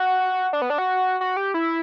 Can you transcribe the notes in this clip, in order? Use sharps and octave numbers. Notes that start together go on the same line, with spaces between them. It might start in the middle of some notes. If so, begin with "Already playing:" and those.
Already playing: F#4
D4
B3
D4
F#4
F#4
G4
E4